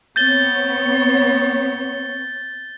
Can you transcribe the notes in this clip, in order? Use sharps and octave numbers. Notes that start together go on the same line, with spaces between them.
B3 C4 C#5 G6 A6 G7